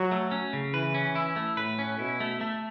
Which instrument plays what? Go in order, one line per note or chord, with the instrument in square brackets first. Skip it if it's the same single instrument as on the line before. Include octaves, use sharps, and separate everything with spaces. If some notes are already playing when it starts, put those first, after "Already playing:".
Already playing: [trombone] F#3 [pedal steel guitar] F#4
[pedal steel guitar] A3
C#4
C#3
[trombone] E3 [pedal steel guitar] B4
[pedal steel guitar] C#4
E4
A3
[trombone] A2 [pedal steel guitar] B4
[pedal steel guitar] C#4
[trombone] B2 [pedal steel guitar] E4
[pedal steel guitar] A3
A3